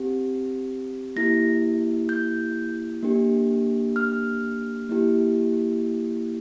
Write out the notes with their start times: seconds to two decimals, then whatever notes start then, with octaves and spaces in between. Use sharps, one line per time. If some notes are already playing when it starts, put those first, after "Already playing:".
Already playing: C4 G4
1.16 A#3 E4 G4 A#6
2.09 G6
3.02 A#3 D4 G4
3.96 F6
4.89 A#3 E4 G4